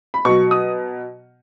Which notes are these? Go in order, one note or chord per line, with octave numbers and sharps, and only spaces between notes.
B5
B2 F#3 C#6
D#6